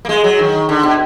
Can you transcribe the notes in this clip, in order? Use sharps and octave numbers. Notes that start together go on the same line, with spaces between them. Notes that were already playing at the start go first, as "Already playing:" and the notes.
A#3
G#3
F#3
D#3
D3
B2